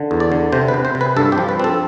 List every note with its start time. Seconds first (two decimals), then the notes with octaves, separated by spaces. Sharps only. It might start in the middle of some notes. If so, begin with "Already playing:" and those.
Already playing: D3
0.11 E2
0.20 D5
0.32 D3
0.52 C3 C5
0.68 B4
0.74 C3
0.85 C5
0.95 C3
1.01 B4
1.17 G2 A4
1.32 G4
1.38 F3
1.49 B4
1.59 C4 A4